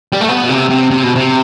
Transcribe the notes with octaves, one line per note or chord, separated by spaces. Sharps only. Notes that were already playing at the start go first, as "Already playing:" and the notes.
G3
A3
B3
B2
C3
C3
C3
B2
C3